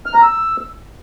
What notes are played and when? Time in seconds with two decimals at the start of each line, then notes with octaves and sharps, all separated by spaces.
0.06 F6
0.14 A#5
0.22 E6